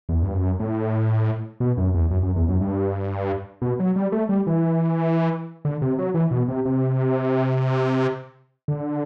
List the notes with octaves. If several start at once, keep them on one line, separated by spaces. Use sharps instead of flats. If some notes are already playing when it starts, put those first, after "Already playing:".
E2
G2
F#2
A2
B2
F#2
E2
F#2
F#2
E2
F#2
G2
B2
F#3
G3
A3
G3
E3
D3
C3
F#3
E3
B2
C3
C3
D3